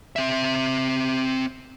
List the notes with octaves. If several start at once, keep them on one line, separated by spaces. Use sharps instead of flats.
C4 E5